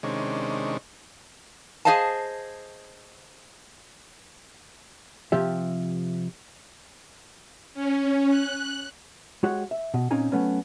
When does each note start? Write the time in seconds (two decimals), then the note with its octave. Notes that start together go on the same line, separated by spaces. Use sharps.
0.03 C3 D#3 G#3 C#4 D4
1.85 G#4 A#4 C5 D#5 F5 A5
5.32 C3 F3 G4 E5
7.74 C#4
8.29 F#6
9.43 G#3 F#4 G4 C#5 F#5
9.71 E5
9.94 B2
10.11 A#2 C4 C#4 D#4 G#5 A#5
10.32 F#3 A3 B3 C#4